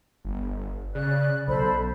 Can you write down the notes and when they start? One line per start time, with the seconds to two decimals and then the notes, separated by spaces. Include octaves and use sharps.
0.25 G1
0.95 C#3 D5 F#6
1.48 B1 A4 C5 B5